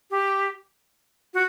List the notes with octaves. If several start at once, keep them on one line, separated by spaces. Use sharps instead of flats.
G4
F#4